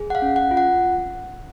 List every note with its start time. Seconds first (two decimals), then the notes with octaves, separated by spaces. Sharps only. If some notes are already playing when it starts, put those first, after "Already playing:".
Already playing: G#4
0.10 F#5
0.15 F5
0.22 C#4
0.36 F#5
0.51 F4
0.57 F#5